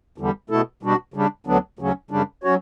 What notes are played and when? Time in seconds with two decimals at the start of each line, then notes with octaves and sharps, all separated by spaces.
0.18 E2 D3 G3
0.50 B2 A3 E4 A4
0.83 B2 G3 D4 F#4
1.14 C#3 G3 D4
1.46 D2 D3 F#3 B3 D4
1.79 D2 C#3 F#3 C#4
2.11 F#2 C#3 G3 D4
2.43 F#3 C#4 F#4 C#5